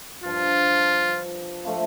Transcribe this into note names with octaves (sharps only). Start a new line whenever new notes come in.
G2 F3 D4 F4
F3 A3 D4 F4